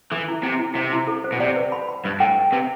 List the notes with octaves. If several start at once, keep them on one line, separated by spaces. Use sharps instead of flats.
E3 A4
E4
C3 E4
E4
C3 C5
E4
A4
C5
B2
C3 D5
B4
B5
B5
G2 B4
A2 G5
G5
C3 B4